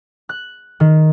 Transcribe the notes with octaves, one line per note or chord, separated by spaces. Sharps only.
F#6
D#3